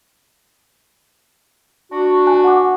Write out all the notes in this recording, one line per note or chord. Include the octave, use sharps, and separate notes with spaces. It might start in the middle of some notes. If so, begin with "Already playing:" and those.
D4 F#4
G#5 A5 F#6
F#5 D6